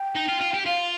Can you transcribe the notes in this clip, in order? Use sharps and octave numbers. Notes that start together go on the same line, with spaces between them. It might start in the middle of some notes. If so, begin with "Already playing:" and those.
Already playing: G5
D#4
F4
F4
G4
F4 F5